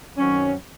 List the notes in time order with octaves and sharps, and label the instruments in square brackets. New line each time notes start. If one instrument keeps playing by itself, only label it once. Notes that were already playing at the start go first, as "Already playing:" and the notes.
[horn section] F#2 D#3 F#3 C4 C#4